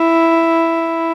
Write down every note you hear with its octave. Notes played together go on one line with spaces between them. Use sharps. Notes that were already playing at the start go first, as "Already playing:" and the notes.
Already playing: E4